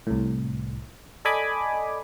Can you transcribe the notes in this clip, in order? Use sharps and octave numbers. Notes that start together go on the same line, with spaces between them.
C2 A2
A4 D5 D#5 G#5 B5 D6